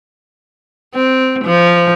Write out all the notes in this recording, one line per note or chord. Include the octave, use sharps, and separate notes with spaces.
C4
F3